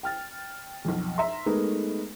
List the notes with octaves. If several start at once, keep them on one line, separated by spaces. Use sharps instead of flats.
G5 F6 A6
B1 F2
E5 A#5 C6
G#3 A3 B3 D#4 A#4 B4